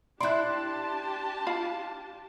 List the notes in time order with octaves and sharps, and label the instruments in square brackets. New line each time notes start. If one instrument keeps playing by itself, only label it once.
[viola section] D4 G4 A5 [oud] E4 D5 [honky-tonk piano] C6 F#6
[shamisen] F4 F5 B5